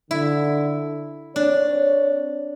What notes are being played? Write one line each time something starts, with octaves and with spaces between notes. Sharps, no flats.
D3 E4
C4 D4 C#5